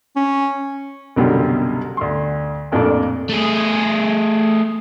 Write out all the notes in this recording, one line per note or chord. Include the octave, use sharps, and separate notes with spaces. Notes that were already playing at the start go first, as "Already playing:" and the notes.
C#4
C2 F#2 B2 D3 F#3 G3
D2 C6
A1 F2 A#2 A3 D4
A3 G#4